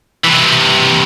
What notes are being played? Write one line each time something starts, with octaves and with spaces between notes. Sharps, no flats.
C3 E3